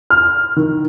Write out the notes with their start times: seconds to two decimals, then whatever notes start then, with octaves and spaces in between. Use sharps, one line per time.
0.10 F6
0.56 D#3